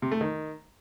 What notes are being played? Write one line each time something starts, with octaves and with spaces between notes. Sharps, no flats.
C3
A3
D#3